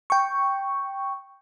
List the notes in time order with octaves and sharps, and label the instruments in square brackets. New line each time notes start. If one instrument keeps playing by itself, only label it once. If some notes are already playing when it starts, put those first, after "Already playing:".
[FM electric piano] G5 C#6